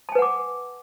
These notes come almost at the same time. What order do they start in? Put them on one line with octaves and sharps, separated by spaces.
A5 G#5 B4 F#5 D6